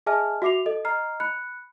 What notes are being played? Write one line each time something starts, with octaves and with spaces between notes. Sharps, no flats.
G#4 D#5 E5 G#5 A5 F6
F#4 E5 D6 C7 F7
A4 D#5
D#5 A#5 F6 C7
B5 F#6 C#7